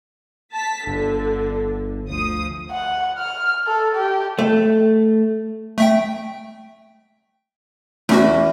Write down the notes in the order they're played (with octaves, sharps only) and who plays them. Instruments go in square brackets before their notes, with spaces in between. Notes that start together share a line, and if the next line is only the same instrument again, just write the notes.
[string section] A5 B6
[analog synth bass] G1 [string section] D3
[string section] D2 F3 D#6
[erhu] F#5
F6
A4
G4
[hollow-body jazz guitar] A3
[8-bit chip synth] A3 E5 G5
[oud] E2 [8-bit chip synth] A3 C#4 F#4